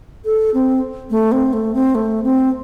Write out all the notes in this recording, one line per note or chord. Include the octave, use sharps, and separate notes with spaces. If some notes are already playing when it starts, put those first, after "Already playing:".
A4
C4
A3
C4
A3
C4
A3
C4